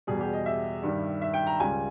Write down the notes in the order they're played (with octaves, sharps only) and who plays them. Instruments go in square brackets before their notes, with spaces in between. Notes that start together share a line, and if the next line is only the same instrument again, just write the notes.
[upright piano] E2 B2 G3 G#4
G4
D#5
E5
G2 D#3 G3
E5
G5
A#5
C#2 C#3 G3 G#5